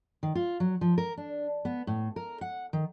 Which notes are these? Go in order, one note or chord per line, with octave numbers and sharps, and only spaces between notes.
D#3
F4
F#3
F3
A#4
D4
B3
A2
A#4
F#5
D#3